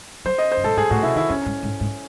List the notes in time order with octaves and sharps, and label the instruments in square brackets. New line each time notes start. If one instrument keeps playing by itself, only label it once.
[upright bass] F#3 [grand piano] C5
[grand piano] D#5
C5
[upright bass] F#2
[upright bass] G#2 [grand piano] A4
[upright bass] G#2 [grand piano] G#4
[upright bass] A2 [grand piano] F#4
[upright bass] C3 [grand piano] E4
[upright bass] D#3 [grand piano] E4
[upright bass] F#2 [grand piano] C#4
[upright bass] G#2
G#2
G#2